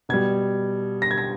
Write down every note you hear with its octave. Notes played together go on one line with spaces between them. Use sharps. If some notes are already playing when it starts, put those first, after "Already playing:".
B2 G3 G#6
A#6
G#6
A#6